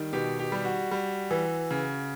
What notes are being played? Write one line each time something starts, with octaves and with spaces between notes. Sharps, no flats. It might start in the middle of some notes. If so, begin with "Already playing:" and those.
Already playing: D#3 G3
B2 G4
G4
G3
F#4
G3
E3
C#3